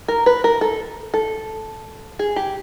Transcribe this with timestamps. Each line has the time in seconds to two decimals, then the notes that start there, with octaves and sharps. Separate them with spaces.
0.08 A#4
0.26 B4
0.44 A#4
0.61 A4
1.14 A4
2.19 G#4
2.36 G4